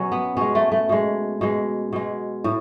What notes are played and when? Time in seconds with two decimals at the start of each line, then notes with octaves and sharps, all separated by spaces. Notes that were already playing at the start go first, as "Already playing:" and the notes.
Already playing: B2 F#3 C#4
0.12 B3
0.37 B2 G#3 C#4
0.55 A3
0.72 A3
0.89 B2 G#3
1.41 B2 G#3
1.93 B2 G#3
2.44 A2